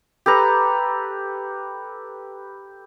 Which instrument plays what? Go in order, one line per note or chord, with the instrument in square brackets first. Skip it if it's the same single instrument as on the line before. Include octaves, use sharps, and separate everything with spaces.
[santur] G4 A4 B4 A#5